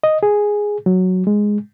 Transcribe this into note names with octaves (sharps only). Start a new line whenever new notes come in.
D#5
G#4
F#3
G#3